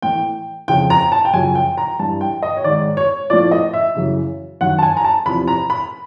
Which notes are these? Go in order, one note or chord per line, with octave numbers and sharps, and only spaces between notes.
A2 E3 G5
F2 C#3 F3 G5
A#5
A5
G5
F#2 C#3 F3 G#5
G5
A#5
G2 E3 A5
G5
D#5
C#5
G#2 D#3 D5
C#5
A2 F3 D5
D#5
E5
F#2 C#3 E3
F#2 D#3 F#5
A5
G#5
A#5
A5
E2 C3 F3 B5
A#5
B5